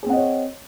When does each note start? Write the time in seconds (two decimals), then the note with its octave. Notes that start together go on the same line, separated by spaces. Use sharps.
0.03 G#4
0.06 C4
0.10 F#5
0.13 D#5
0.16 C#5